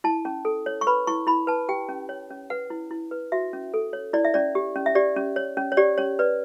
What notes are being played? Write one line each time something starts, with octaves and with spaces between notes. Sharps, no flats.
E4 A5
C#4
A4
C#5
C#6
B4 B5
E4 C#6
E4 B5
B4 A5
G4 G5
C#4
C#5
C#4
B4 F#5
E4
E4
B4
F#4 E5
C#4
A4
C#5
E4 D5
E5
C#4 D5
G4
C#4
E5
G4 D5
C#4
C#5
C#4
C#5
G4 D5
C#4 C#5
B4 D5